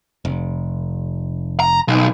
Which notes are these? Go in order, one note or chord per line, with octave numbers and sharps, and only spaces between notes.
F1
A#5
B1